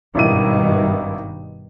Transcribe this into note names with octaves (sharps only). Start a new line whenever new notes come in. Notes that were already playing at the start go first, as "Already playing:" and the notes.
G#1 G2 B2 D#3 E4 D#7